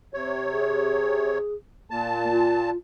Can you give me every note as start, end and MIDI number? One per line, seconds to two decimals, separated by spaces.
0.14 1.38 48
0.14 1.38 73
0.51 1.54 68
1.91 2.70 46
1.91 2.25 58
1.91 2.70 81
2.31 2.77 65